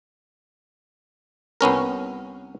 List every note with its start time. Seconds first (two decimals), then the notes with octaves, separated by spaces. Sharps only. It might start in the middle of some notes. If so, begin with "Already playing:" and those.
1.61 C2 B3 C#4 A#4